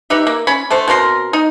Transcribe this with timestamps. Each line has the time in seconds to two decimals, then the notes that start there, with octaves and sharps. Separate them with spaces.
0.10 D#4 G4 B4 E5
0.27 A#3
0.47 C#4 B5
0.70 D3 A3 C5
0.88 B2 C4 A#4 C6
1.33 D#4